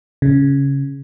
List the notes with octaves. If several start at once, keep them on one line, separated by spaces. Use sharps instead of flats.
C#3